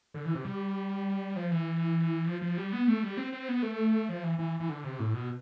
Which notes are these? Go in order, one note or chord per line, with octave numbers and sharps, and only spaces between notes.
D3
E3
C3
G3
F3
E3
F3
F3
G3
B3
A3
G3
C4
C4
B3
A3
F3
E3
E3
E3
D3
C3
A2
B2